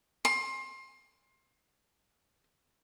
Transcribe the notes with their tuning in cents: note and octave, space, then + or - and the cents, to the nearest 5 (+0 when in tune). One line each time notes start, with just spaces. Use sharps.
C6 +25